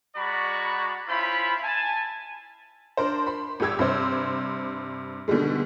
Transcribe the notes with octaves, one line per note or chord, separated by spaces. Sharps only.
G#3 F#4 D5 A#5 B5 C#6
C#4 E4 F4 C5 B5
G#5 A5
D4 A#4 C5
B5 C6
G#1 G#2 G4 E6 G#6
G2 C3 C5
B2 D3 D#3 G3 G#3